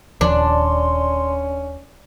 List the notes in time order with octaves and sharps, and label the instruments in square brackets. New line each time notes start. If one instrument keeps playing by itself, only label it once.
[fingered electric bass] D#1 F3 [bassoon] C#4 [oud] D4 [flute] C6